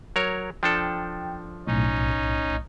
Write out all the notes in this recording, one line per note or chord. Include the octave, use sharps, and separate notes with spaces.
F#3 A#4 C#5
F3 D4 A4 G5
B1 A2 C#4 D#4